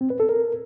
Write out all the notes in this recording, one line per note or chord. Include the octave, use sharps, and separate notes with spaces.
C4
B4
A4
A#4